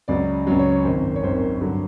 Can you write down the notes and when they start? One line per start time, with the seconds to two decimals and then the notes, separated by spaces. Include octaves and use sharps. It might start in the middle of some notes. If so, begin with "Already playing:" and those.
0.08 C#2 C#3 F#3 D5
0.47 C#2 C#3 F#3
0.59 C#5
0.72 C#5
0.84 G#1 F#2 D#3 C5
1.16 C#5
1.23 G#1 F#2 D#3 C5
1.61 G2 D3 F#3